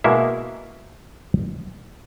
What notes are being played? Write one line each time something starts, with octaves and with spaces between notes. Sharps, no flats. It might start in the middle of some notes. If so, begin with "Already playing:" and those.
B2 G#3 A#3 E4 E5